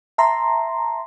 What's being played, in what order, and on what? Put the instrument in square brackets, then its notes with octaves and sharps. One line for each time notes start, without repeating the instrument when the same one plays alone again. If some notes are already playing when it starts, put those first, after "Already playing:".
[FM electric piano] E5 A5 A#5 C6